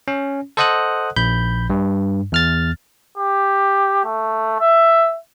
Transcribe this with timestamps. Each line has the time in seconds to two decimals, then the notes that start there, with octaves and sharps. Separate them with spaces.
0.08 C#4
0.57 A4 C5 D#5 F#5 D#6 F#6
1.16 A#1 B5 G6
1.70 G2
2.32 E2 F6 A6
3.18 G4
4.05 A3
4.59 E5